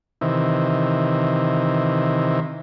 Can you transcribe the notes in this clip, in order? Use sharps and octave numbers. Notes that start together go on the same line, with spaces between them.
C3 D#3 E3